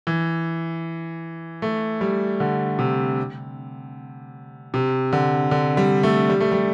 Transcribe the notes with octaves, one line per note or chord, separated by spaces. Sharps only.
E3
A3
G3
D3
C3
C3
D3
D3
G3
A3
G3
A3
G3